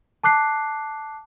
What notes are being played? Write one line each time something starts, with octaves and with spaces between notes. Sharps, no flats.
A5 D6 F#6 C7